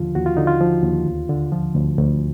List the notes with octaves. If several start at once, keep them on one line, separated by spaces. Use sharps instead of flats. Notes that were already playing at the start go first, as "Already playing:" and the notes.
Already playing: D#2 D3 F3 F4
D#2 F#4
F4
D3 D#4
F4
F3
D#2
D2
D3
F3
D2
D2